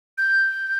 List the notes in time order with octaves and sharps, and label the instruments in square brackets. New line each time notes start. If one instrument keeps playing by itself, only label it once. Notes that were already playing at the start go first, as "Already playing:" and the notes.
[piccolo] G6